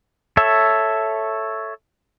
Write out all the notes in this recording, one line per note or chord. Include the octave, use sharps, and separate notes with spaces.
A4 C#5 E5